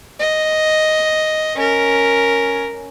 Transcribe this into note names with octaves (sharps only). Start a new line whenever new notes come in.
D#5
C#4 A#4